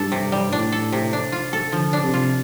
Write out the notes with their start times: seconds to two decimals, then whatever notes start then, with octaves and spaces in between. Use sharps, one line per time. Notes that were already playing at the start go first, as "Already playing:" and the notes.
Already playing: G2 D4 A4
0.12 C3
0.32 G3
0.52 A2 D4
0.72 A4
0.93 C3
1.13 D4
1.32 F4
1.53 A4
1.72 D3 F3
1.93 D4
2.03 C3
2.13 F4